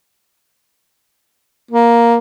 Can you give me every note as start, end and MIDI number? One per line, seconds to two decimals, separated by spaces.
1.71 2.17 58